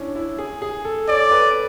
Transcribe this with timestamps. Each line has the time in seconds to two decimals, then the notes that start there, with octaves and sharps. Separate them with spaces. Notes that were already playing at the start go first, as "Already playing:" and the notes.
Already playing: C#4 D4 E4
0.15 E4
0.38 G#4
0.62 G#4
0.85 A4
1.09 C#5 D5
1.31 B4